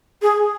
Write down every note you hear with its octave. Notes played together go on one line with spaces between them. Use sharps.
G#4